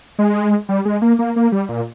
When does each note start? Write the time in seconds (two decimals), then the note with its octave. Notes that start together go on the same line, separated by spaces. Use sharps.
0.19 G#3
0.69 G3
0.85 G#3
1.02 A#3
1.19 A#3
1.36 A#3
1.52 G3
1.69 A#2